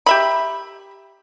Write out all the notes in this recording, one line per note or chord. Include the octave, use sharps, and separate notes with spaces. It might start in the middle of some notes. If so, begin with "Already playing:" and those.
G4 E5 B5